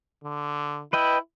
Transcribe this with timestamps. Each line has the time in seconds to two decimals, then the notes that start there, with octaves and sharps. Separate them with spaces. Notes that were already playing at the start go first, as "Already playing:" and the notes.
0.24 D3
0.93 E4 B4 D#5 G5